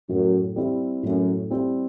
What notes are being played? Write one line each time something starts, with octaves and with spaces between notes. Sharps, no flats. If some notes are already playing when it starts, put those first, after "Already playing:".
F#2 A2
G3 C4 E4
F#2 A2
G3 C4 E4